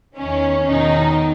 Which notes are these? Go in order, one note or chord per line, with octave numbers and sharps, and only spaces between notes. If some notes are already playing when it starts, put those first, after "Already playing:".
E2 D#3 C#4
E2 B2 D#3 D#4